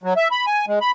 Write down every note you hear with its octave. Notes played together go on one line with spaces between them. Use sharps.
F#3
E5
B5
G#5
G#3
B5